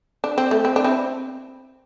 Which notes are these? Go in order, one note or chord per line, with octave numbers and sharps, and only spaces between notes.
D4
C4
A3
C4
D4
C4 E4